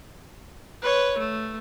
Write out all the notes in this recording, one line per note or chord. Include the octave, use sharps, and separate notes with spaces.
B4 C#5
A3